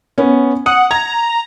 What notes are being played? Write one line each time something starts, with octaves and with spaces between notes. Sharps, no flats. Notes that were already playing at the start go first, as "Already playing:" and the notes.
B3 C#4
F#5 D#6
A#5 G#6